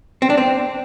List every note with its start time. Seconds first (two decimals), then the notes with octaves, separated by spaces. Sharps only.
0.22 C4
0.30 D4
0.38 C4